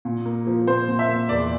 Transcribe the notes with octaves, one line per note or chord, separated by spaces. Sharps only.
A#2
A#3
F3
A#2 C5
A#2
E5
A#3
E2 D5